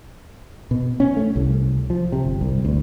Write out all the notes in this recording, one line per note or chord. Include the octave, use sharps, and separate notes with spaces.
B2
C#4
A3
C2
F3
C3
G1
C2
D2